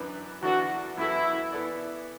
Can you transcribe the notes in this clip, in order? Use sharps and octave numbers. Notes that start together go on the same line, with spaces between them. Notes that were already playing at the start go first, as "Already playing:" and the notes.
Already playing: F#2 E3 D4 B4
E2 E3 D4 F#4 A4 D5
F#2 E3 B3 E4 F#4 A4
E3 B3 E4 A4 D5